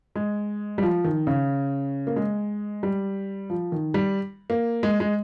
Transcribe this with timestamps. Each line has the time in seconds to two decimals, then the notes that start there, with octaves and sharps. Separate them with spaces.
0.16 G#3
0.78 G3
0.83 F3
1.04 D#3
1.27 C#3
2.07 A#3
2.16 G#3
2.83 G3
3.50 F3
3.72 D#3
3.94 G3
4.50 A#3
4.83 G#3
5.00 G#3